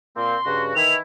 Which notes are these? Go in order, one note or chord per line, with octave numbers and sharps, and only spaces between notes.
A#2 A#3 C4 C6
G2 C#3 F#4
D#3 E3 E4 F7